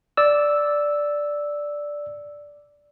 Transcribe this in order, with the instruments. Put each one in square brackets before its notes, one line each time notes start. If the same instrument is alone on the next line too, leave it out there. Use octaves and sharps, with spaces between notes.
[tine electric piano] D5 E6